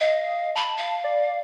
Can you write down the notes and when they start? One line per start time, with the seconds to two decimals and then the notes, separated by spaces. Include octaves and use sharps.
0.01 D#5 F5
0.56 A5 B5
0.77 F5
1.04 D5